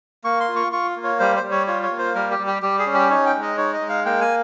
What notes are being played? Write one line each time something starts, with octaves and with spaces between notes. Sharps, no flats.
A#3 C#6
C6
F4
C#6
F4 C#6
A#3
C#5
G3 C5
C5
G3
C#5
F4 C#5
C#5
A#3
C5
G3 A#4
G4
G3
G4
G3 G4
G#4
C#4
G4
D#4 C#5
G5
G#3
D#5
D#4 C#5
D#5
G#3
F5
A#3 G5
G#5